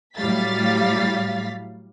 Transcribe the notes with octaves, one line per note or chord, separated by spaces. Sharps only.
A2 F#3 G3 F5 A6 B6